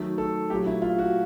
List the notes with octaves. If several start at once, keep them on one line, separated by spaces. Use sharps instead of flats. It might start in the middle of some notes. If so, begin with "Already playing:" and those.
Already playing: D#3 F#3 A3
A4
A#2 F#3 A3 G4
E4
F4
F#4